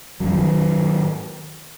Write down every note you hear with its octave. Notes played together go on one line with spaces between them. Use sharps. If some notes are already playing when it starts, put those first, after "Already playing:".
F2 C#3 F#3
F3
D#3 F#3
G#2